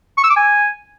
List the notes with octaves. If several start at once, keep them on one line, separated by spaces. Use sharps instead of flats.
C#6
E6
D6
G#5